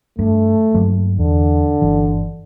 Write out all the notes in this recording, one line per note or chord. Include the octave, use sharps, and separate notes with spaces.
G2 A3
G2 F#3 A#3
E2 D3
G1 E3